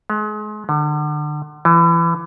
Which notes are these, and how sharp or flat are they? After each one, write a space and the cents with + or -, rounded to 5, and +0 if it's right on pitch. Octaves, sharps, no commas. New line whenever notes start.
G#3 +35
D3 +35
E3 +25